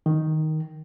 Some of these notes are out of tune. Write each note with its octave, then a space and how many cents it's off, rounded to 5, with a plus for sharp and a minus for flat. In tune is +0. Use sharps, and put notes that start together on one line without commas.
D#3 +5